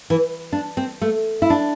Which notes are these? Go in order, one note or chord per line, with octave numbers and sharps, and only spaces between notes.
E3
D4
C4
A3
E4
D4